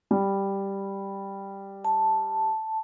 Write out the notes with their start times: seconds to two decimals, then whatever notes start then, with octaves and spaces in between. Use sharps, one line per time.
0.11 G3
1.85 A5